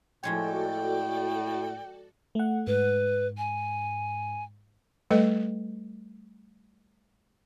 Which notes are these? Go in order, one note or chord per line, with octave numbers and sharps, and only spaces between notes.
A2 F3 G#3 F#4 A4 C#5 D5 G5
A3 F#5
G#2 B4
G#5
G3 A3 A4 B4 D#5